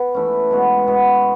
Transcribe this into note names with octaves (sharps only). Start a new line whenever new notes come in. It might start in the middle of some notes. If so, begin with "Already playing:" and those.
Already playing: B3
E3 A3 C#4
B2 G#3 B3 F#4
B2 G#3 B3 F#4